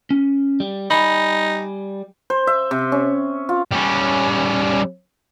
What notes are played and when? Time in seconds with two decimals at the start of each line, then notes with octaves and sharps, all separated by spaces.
0.11 C#4
0.60 G3
0.91 G3 D#4 G#5 B5
2.30 C5
2.47 E5
2.71 C3
2.92 C#4
3.49 F4
3.71 G3 C#4